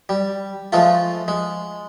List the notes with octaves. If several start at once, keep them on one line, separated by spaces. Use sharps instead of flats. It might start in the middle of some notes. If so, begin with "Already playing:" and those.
G3
F3 G#3 A3 F4
G#3